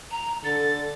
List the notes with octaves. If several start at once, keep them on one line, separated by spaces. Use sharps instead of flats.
A#5
D3 A4 A6